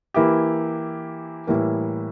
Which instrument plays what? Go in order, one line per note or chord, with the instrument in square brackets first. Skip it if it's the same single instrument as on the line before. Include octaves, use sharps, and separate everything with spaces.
[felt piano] E3 A#3 E4 G4
A2 E3 G3 A#3